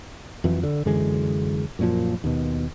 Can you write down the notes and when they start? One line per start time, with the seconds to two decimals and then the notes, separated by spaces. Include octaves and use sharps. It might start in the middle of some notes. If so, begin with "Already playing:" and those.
0.44 F2 E3 F#3
0.63 D3
0.85 F#2 D3 E3 G#3
1.79 F#2 A#2 F3
2.24 D#2 B2